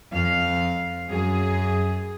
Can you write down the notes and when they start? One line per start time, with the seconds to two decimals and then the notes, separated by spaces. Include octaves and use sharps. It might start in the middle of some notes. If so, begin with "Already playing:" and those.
0.12 F2 F5
1.10 F#2 G#4